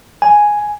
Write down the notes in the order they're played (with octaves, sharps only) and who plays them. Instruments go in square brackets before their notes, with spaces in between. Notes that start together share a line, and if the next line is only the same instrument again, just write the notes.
[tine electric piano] G#5